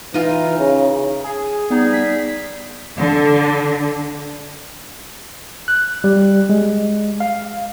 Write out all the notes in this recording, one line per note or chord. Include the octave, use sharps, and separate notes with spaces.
E3 D#4 F4
C#3
G#4
G3 B3 D#4 G#4
B6
D3
F#6
G3
G#3
F5